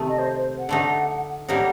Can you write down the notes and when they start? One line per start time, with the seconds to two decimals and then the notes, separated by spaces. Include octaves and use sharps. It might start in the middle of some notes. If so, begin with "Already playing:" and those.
Already playing: C3 D#3 A3
0.09 D#5
0.19 C5
0.38 C5
0.59 F#5
0.69 D3 A3 D#4
1.49 A2 G3 A#3 D#4 F#5